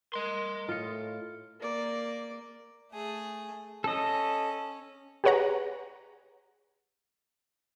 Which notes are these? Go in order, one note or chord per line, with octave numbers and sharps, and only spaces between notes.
A#4 D#5 C6
A2 F4 C#7
A#3 D5
A3 G#4
C#4 A4 D#5
G4 G#4 B4 C#5 F#5 A#5